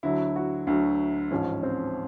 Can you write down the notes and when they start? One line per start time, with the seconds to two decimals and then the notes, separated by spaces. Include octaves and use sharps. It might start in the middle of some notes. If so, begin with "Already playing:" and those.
0.03 D2 D3 F#3 E4
0.36 F#4
0.67 D2 D3 F#3
1.31 A1 G#2 F3 C#4
1.63 C4